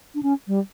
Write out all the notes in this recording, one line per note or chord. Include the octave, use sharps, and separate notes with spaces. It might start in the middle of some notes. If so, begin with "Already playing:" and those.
D4
C#4
G3